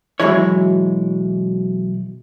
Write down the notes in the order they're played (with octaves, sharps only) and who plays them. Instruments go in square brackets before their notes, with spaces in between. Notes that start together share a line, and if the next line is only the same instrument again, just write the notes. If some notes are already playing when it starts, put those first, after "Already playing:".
[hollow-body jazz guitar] B1 E3 F#3 G#3 E4 C#5